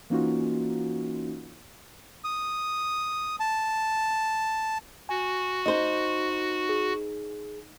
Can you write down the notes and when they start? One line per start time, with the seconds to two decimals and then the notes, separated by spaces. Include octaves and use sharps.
0.10 E3 A#3 C#4 D#4 F4 F#4
2.24 D#6
3.40 A5
5.09 F#4 G#5
5.66 D#4 C5 D#5
6.69 G#4